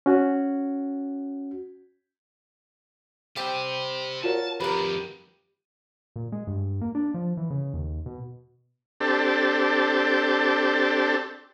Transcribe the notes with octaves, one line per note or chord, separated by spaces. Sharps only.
C#4 F#4
G3 C4 G4 C5 G5
F4 F#4 A#4 C#5 A5
F2 D#3 G4 A#4 B4
A#2
G#3
G2
A#3
D4
F3
E3
C#3
D#2
B2
C4 D4 G4 A4